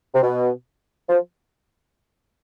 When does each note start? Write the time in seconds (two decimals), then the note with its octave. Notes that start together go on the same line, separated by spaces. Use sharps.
0.14 C3
0.23 B2
1.09 F3